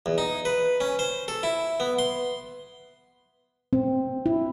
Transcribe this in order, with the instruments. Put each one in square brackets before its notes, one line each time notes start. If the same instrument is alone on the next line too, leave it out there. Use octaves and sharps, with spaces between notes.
[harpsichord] E2
D#4
B4
C#4
C5
A4
E4
B3
C6
[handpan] C4
E4